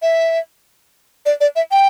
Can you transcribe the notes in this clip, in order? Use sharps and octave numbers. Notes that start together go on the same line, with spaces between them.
E5
D5
D5
E5
G5